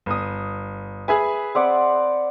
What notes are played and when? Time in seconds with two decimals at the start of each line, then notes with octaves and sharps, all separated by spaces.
0.06 G1 D#6
1.08 G#4 B4 E5 G#5
1.55 C4 D5 F#5